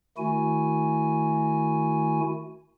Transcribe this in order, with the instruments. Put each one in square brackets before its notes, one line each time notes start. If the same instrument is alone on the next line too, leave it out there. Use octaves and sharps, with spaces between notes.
[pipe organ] D#3 A3 E4 F#4 G#5